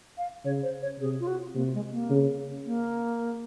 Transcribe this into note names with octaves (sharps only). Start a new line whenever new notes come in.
F5
C#3 C#5
C5
C#5
C3 G#4
F4
F#4
C3 A#3
G#3
A#3
C#3
A#3